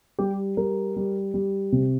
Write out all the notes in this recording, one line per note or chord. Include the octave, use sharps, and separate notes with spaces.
G3 G4
G3 A#4
G3
G3
C3